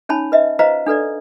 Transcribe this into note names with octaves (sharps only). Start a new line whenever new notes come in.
C#4 D#4 C#5 G#5 A5 B5
B4 D#5 E5
F4 B4 C5 D#5 F5 A#5
D4 A4 B4 D5